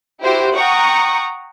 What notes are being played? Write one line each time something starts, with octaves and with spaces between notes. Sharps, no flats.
E4 F#4 G4 C5
F#5 G5 A#5 C#6 D#6